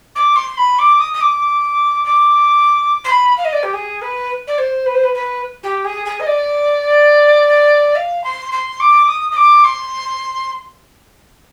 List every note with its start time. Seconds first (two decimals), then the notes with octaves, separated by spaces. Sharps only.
0.15 D6
0.35 C6
0.57 B5
0.78 D6
0.99 D#6
1.13 D#6
1.20 D6
2.04 D6
3.04 C6
3.10 B5
3.36 F5
3.44 D#5
3.52 D5
3.62 G4
3.73 G#4
4.01 B4
4.47 D5
4.58 C5
4.85 B4
4.94 C5
5.03 B4
5.14 B4
5.63 G4
5.84 G#4
6.05 G#4
6.19 D#5
6.26 D5
7.95 F5
8.23 C6
8.51 C6
8.79 D6
9.07 D#6
9.31 D#6
9.36 D6
9.64 C6